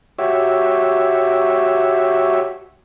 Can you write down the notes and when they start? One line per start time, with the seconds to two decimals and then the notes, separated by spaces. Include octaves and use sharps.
0.18 F#4 G4 C#5 E5